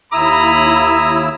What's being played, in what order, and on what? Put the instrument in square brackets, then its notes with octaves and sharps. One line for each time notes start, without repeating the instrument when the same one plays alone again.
[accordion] D#2 E4 E6 [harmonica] A#5 D#6 [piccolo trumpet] B5